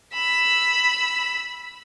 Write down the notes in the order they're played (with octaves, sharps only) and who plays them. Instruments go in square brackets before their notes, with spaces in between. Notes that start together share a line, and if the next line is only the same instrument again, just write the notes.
[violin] B5 E6